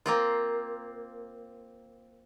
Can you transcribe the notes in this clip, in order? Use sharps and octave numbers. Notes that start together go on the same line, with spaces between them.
A#3 C4 F4